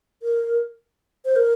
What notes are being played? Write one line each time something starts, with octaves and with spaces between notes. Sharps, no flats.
A#4
C5
A#4